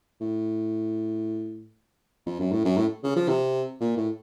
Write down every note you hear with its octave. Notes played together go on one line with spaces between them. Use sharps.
A2
F2
F#2
A2
F#2
A2
C#3
F3
C3
A#2
A2